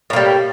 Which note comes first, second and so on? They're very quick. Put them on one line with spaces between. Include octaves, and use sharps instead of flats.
A2 A#3 G3